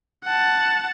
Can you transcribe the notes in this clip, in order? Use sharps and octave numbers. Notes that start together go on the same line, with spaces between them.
F#5 A5